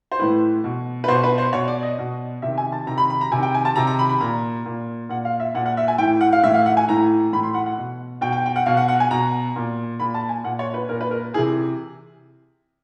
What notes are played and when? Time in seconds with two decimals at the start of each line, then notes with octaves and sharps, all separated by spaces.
0.12 C5
0.19 A2 E3 B4
0.64 B2
1.04 B4
1.08 B2 C5
1.23 B4
1.38 C5
1.53 B2 C#5
1.68 D5
1.83 D#5
1.99 B2
2.42 C3 D#3 E5
2.58 G#5
2.72 A5
2.87 C3 D#3 A#5
2.98 B5
3.10 B5
3.21 A#5
3.32 C3 G#5
3.36 D#3
3.43 G5
3.55 G#5
3.65 A5
3.76 C3 D#3 A#5
3.87 A#5
3.99 B5
4.09 B5
4.21 A#2 A#5
4.66 A#2
5.09 A#2 F#5
5.25 F5
5.40 E5
5.55 A#2 F#5
5.66 F#5
5.77 E5
5.88 G#5
5.98 A2 E3 G5
6.21 F#5
6.33 F5
6.44 A2 E3 E5
6.54 F5
6.66 F#5
6.77 G#5
6.88 A2 E3 A#5
7.33 A2 E3 B5
7.43 C6
7.54 F#5
7.66 F#5
7.78 B2
8.21 B2 G5
8.32 G5
8.46 G5
8.56 F#5
8.66 B2 F5
8.77 F#5
8.88 F#5
9.00 G#5
9.11 B2 A#5
9.56 A#2
10.00 A#2 B5
10.14 A5
10.29 G#5
10.44 A#2 F#5
10.59 C#5
10.74 B4
10.89 A#2 A#4
11.01 B4
11.11 A#4
11.34 E3 G#4
11.38 C3